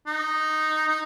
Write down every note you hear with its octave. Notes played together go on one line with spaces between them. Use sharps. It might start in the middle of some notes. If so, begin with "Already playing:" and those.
D#4
D#4